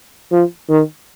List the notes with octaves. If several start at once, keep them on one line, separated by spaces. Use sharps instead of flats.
F3
D#3